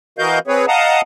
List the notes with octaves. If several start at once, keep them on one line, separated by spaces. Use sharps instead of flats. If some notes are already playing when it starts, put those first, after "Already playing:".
E3 F#4 A#4 D#5 F5 G6
C4 G#4 B4 C#5
D#5 F5 F#5 A5 A#5 D#6